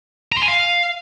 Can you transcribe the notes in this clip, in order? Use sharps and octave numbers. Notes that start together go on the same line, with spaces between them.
A#5
C6
G#5
F5